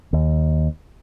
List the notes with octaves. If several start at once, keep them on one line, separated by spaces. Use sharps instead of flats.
D#2